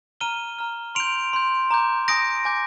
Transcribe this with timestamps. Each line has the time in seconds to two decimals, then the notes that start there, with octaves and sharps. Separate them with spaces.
0.20 A#5 F6 D#7 G7
0.59 A#5 F6
0.95 C6 G6 D7 F7
1.33 C6 G6
1.71 A#5 D6 G6
2.08 G#5 D#6 G6 A#6 D7
2.45 G#5 D6 G6